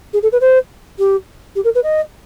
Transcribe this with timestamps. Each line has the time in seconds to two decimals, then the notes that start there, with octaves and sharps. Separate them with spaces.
0.13 G#4
0.22 A4
0.32 B4
0.41 C5
0.98 G4
1.55 G4
1.64 A#4
1.75 B4
1.83 D#5